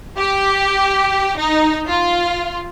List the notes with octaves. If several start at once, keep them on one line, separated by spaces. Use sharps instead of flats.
G4
D#4
F4